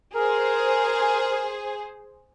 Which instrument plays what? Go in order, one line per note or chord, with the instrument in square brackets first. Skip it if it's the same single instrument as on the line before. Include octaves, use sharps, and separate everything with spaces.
[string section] G#4 C5 [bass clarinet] A#4